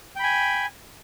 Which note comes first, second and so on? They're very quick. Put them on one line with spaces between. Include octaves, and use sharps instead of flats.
G5 B5 G#5